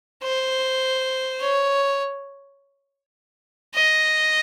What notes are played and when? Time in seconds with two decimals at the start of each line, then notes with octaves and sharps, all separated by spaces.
0.23 C5
1.40 C#5
3.75 D#5